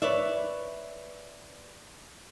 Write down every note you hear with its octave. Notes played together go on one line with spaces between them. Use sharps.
B4 C#5 D5 E5